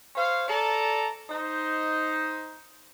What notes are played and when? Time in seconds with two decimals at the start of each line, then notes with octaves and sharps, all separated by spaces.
0.15 C5 C#5 F5
0.49 A4 D5 A5 A#5
1.30 D#4 C5